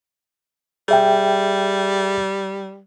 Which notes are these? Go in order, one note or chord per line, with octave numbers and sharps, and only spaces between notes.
G3 G#4 E5 G5